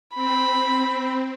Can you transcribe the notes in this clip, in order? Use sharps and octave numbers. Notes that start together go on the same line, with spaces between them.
C4 B5